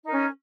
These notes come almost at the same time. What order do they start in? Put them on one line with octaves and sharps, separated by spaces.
D#4 A#4 C#4